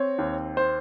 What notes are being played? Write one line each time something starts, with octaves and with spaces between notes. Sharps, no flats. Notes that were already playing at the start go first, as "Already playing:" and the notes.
Already playing: C4 C#5
D#2
C5